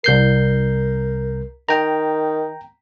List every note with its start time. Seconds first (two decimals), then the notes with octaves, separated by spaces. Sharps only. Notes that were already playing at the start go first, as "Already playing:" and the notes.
0.04 C2 A#4 G6 C7
1.69 D#3 G5 A#5